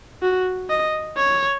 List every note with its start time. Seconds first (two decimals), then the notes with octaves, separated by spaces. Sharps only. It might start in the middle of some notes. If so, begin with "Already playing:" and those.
0.23 F#4
0.70 D#5
1.17 C#5